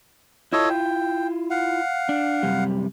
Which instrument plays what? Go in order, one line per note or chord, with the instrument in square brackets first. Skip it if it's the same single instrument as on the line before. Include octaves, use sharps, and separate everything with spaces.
[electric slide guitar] E4 F4 [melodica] A4 C#5 D#5
[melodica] G5
F5 F#5
[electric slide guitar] D4
F#2 C3 G3